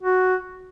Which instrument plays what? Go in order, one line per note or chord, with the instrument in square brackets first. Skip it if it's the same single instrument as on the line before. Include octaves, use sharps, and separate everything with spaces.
[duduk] F#4